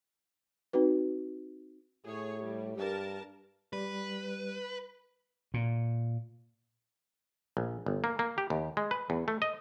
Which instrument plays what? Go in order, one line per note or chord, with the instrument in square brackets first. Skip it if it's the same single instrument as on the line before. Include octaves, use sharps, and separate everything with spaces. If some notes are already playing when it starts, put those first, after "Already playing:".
[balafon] C4 D#4 F#4 B4
[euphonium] A2 [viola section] G#4 C#5
[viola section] G3
[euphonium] G2 [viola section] G4 A#4 A5
[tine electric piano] G3 [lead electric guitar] B4
[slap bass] A#2
[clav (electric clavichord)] A#1
G1
A#3
A#3
G4
D#2
G#3
B4
E2
A3
D#5